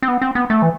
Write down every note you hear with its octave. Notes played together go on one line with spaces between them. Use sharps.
C4
B3
C4
B3
A3
E3